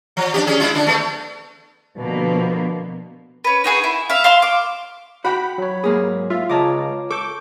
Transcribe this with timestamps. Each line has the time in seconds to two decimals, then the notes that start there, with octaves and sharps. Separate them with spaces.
0.17 F3
0.34 D4 F#4 G4
0.47 C#4 G#4
0.60 G#3 E4 F4
0.75 D3 D4
0.87 A3 B3
1.98 B2 D3 F3 A#3 B3
3.44 C#4 B4
3.64 D#4 F#4 G#4 B4
3.84 E4
4.10 E5 F5
4.24 F5 C6 E6
4.42 F5 D6
5.25 F#4 F#5 G5 B5
5.58 F#3 C#5
5.84 G#2 A#3 G#4
6.30 F4 E5
6.50 C#2 C#5 D#5 A5 A#5 D6
7.11 A4 C#6 D6 G6